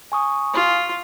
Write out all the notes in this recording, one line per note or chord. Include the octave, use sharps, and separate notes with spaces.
G#5 C#6 D#6
F4